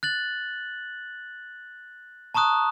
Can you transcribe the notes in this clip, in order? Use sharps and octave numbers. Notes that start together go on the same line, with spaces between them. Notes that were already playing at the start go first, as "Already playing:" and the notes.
F#6 A6 F#7
A5 A#5 C#6 D#6 F#6